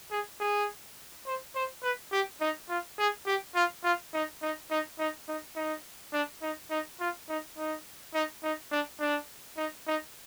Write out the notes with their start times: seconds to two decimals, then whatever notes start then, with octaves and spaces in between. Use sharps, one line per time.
0.11 G#4
0.40 G#4
1.27 C5
1.56 C5
1.83 B4
2.12 G4
2.41 D#4
2.69 F4
2.99 G#4
3.26 G4
3.55 F4
3.84 F4
4.14 D#4
4.42 D#4
4.71 D#4
4.99 D#4
5.28 D#4
5.56 D#4
6.13 D4
6.42 D#4
6.71 D#4
7.00 F4
7.29 D#4
7.58 D#4
8.14 D#4
8.43 D#4
8.72 D4
9.00 D4
9.57 D#4
9.87 D#4